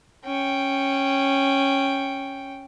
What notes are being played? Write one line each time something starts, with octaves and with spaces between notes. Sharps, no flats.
C#4 G5